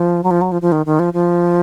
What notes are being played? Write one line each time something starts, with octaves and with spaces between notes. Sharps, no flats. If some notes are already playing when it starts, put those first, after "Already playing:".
Already playing: F3
F#3
F3
F#3
F3
F3
D#3
D#3
F3
F3